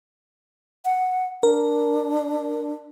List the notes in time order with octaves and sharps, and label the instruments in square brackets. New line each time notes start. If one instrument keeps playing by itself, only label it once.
[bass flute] F#5
[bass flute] D4 [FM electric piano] A#4